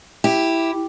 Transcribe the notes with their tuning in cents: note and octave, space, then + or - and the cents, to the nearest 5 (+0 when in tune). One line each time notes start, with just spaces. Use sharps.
E4 +0 G4 +0